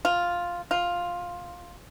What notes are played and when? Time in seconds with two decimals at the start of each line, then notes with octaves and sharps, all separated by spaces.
0.05 F4
0.71 F4